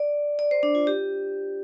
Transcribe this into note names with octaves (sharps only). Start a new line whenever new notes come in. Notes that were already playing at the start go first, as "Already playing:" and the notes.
Already playing: D5
D5
C5
D4
F4
G4